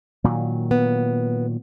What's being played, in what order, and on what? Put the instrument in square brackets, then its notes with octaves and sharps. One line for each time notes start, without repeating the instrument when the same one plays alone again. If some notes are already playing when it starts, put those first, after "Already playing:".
[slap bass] A#2 D#3 F#3
[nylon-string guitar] B3